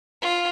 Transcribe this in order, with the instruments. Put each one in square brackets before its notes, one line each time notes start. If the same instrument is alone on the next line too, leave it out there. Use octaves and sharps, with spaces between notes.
[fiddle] F4